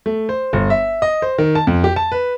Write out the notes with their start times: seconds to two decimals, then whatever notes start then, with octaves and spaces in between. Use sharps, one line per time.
0.06 A3
0.29 C5
0.53 G1
0.70 E5
1.02 D#5
1.22 C5
1.38 D#3
1.55 A5
1.67 F2
1.84 G4
1.96 A5
2.12 B4